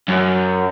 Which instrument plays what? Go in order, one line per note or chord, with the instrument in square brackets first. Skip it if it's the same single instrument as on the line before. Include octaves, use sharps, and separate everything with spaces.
[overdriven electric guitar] F#2